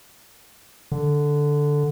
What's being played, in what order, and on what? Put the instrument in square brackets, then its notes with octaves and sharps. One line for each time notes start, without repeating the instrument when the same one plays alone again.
[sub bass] D3